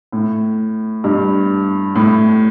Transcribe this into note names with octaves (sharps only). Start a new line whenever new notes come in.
A2
G2
A2